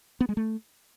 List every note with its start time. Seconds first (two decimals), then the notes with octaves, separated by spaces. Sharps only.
0.21 B3
0.29 G#3
0.37 A3